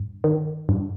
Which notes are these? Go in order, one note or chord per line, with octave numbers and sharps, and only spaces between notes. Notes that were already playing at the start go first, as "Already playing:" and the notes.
Already playing: G2
D#3
G2